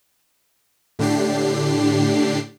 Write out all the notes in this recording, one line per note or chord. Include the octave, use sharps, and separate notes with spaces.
A2 D3 D4 G4 C7